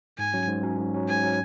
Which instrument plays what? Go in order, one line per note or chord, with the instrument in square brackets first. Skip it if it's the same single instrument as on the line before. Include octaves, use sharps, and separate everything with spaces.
[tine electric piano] G#2 [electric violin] G#5
[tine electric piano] F#3 C#4
G#2
F#3 C#4
G#2
F#3 C#4
[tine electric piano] G#2 [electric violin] G#5
[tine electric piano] F#3 C#4